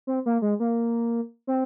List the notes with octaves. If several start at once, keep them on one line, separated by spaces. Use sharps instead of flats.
C4
A#3
G#3
A#3
C4